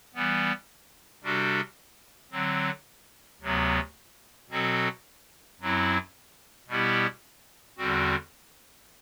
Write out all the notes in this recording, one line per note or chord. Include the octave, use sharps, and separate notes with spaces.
E3 G3 B3
C3 G3 D4 F#4 A4
D3 F#3 C4
D2 C3 F#3 B3
B2 F#3 C4 F#4 A4
F#2 F#3 C4 E4
B2 G3 B3 E4 G4
E2 D3 G3 C4 F#4